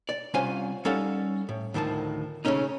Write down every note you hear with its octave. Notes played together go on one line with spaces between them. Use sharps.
D5
C2 C#4 F4 C5 F5 G#5
G3 C#4 D#4 A4 F5 F#5
A2
D2 A2 D#3 F3 A5
C#3 E3 A3 C#4 D#4